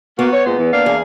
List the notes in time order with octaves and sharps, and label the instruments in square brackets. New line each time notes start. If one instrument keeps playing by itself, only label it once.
[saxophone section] A#3 F#4 [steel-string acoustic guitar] B3
[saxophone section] C#5
A#2 G#3 C5
E2
A#3 D4 F5
[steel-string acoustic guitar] E2 G#4